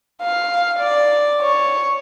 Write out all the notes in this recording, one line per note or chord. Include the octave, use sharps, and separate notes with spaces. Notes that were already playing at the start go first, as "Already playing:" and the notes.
F5
D5
C#5